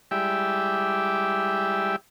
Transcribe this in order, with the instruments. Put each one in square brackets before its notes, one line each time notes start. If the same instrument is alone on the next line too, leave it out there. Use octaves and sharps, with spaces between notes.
[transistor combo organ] G3 G#3 E4 G4 D5 E5